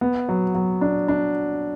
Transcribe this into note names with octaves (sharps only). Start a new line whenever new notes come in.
B3
F#3
F#3
D4
D4